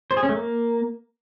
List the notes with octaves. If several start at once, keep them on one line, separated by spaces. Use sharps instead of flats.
C5
G#4
C#4
A3
A#3